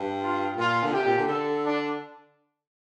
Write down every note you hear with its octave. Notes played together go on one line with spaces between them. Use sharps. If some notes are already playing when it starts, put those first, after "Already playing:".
Already playing: G2
F4
A#2 F4
D3
C3 G4
A#2
D3
D3 A4
D4